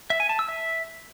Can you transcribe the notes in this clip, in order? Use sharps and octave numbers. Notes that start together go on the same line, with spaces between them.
E5
G#5
A5
E6
E5